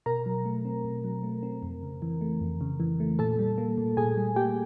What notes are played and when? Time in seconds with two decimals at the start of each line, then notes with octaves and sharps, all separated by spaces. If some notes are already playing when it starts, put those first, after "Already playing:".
0.06 B2 A#4 A#5
0.26 F#3
0.45 A3
0.65 C4
0.85 B2
1.04 F#3
1.23 A3
1.43 C4
1.63 F2
1.83 C#3
2.02 E3
2.21 A3
2.41 F2
2.61 C#3
2.80 E3
3.00 A3
3.19 A#2 A4 A5
3.39 G3
3.58 A#3
3.78 A#2
3.97 A#2 G#4 G#5
4.17 G3
4.36 A#3 G4 G5